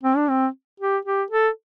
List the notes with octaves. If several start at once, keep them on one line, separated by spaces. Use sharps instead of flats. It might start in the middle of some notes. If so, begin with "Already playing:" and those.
C4
D4
C4
G4
G4
A4